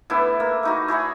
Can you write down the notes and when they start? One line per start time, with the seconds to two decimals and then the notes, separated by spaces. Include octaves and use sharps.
0.10 A2 B3 D4 E4
0.40 A#3
0.63 A3 D#4 F#4
0.88 E4 G#4 C#5 F#5